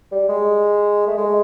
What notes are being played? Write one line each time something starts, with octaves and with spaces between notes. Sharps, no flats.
G3
G#3
A3
G#3